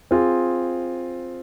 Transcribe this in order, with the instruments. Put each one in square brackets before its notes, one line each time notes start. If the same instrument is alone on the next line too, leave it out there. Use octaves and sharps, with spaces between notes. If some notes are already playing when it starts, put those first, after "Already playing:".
[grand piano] C4 F4 G#4